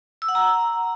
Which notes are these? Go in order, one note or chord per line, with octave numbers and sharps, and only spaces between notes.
E6
F#5
A#5